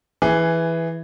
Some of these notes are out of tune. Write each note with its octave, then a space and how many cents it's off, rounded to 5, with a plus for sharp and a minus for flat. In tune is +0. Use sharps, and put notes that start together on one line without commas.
E3 +0 G#4 +0